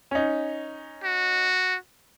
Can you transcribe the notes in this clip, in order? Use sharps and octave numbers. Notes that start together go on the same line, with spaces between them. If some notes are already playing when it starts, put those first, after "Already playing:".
C#4 D#4
F#4